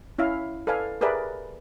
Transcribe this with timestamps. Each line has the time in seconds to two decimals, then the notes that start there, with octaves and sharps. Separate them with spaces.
0.18 C#4 E4 E5 F5
0.67 A4 B4 D5 F5 G#5
1.01 G4 G#4 A#4 B4 D5 E5